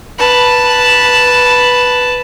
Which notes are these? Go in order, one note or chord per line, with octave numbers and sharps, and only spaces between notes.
B4 A5